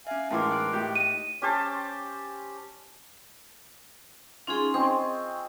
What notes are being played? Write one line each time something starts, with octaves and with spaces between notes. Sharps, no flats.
C#4 E5 F5 G#5
A2 E3 G#3 A#4 F5 A5 C6 D6
D#4 F#6 D7
A2 G4
D#5 D#7
C#4 G4 C5 A5
C#4 D#4 F4 G#4 G#5 C6
C4 G#4 D#5 C#6